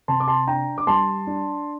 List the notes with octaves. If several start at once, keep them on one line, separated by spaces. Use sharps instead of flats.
C3 A5 C6
D6
A5 C6
D4 G5 A#5
D6
G3 A5 C6
D4